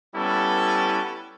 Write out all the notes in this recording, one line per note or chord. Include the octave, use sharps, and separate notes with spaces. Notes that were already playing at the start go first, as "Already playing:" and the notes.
G3 B3 C#4 E4 A4